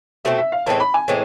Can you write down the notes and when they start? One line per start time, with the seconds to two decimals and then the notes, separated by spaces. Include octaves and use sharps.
0.25 B2 A3 C4 E5
0.38 E5
0.52 F5
0.66 A2 E3 G#3 C4 A5
0.80 B5
0.94 G#5
1.08 A2 E3 G#3 C4